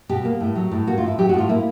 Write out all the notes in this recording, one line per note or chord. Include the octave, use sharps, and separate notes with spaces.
B2 G4
A#3
A2
F#3
A2
A#3 F#4
F4
A2
E4
F#3 G4
F#4
A2 F4
A#3 E4